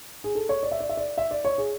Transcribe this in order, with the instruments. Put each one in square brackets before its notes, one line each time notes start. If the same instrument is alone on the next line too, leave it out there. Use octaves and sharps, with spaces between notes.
[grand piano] G#4
A4
C#5
D5
E5
D5
E5
D5
E5
D5
C#5
G#4